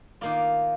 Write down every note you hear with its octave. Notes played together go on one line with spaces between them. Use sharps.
D#3 A#3 F4 D5